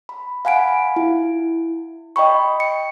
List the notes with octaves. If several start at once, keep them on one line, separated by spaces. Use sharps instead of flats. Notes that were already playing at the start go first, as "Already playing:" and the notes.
B5
F5 F#5 G#5 B5 D7
E4
D#5 G5 B5 C#6
C#7